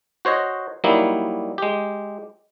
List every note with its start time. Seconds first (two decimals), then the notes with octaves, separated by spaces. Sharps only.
0.25 F#4 C5 C#5 D#5
0.84 F#3 G3 A#3 D#4 E4
1.58 G#3 G4